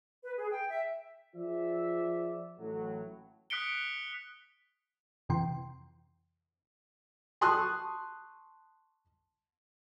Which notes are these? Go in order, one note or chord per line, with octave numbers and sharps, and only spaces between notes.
B4
G#4
G5
E5
F3 F4 G#4 C5 D5 E5
A1 A2 F#3
D#6 F#6 B6 C#7 D7 G7
F2 C3 E3 G5 C6
A5 C6 C#6 D#6 F#6